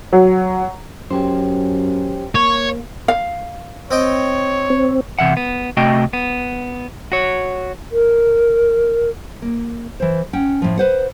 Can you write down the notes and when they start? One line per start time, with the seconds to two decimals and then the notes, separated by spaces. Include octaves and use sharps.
0.13 F#3
1.11 F#2 C#4 G4 C5
2.35 A#3 C#5
3.08 F5
3.91 C4 C#5 D#5 G5
4.70 C4
5.19 C3 E3 E5 F#5
5.37 B3
5.77 C3 A3 F#4 D#5 G5
6.13 B3
7.12 F#4 C#5
7.92 A#4
9.42 A#3
10.00 E3 C5
10.33 C#4 F#5 G5
10.62 A2 F3
10.77 B4 C5 F#5